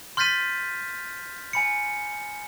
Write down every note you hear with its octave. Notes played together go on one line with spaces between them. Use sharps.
C6 F6 G6 A6 B6 D#7
G#5 B5 C#7